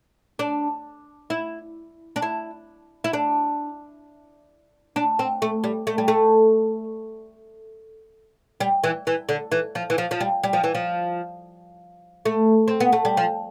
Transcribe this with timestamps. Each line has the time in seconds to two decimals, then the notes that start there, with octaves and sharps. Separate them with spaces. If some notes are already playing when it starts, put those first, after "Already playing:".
0.39 D4
1.30 E4
2.16 D4
2.22 E4
3.04 E4
3.13 D4
4.96 D4
5.19 C4
5.42 A3
5.64 G3
5.87 A3
5.98 G3
6.08 A3
8.60 G3
8.84 E3
9.07 E3
9.29 D3
9.52 E3
9.75 F3
9.90 E3
9.98 F3
10.11 F3
10.20 G3
10.43 G3
10.53 F3
10.64 E3
10.75 F3
12.25 A3
12.68 C4
12.80 B3
12.93 A3
13.05 G3
13.17 F3